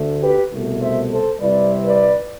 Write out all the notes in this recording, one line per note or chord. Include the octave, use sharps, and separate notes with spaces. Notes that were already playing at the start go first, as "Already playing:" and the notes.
Already playing: D2 D3 A3
G4 B4
C2 B2 A3
C5 E5
A4 C5
C3 G3 C4 E4 B4 D5
B4 D5